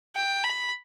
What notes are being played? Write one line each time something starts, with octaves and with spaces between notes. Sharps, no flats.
G5
B5